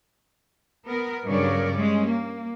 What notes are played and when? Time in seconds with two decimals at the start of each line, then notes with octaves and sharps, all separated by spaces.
0.87 B3 A#4
1.26 G2 C#3 F#3 A#4 C#5 D5
1.74 G3 G#3 C#4
2.07 A#3